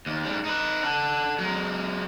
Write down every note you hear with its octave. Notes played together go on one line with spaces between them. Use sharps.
D#2
G#2 G3
D#4 B4
A4 F#5
F#3 G#3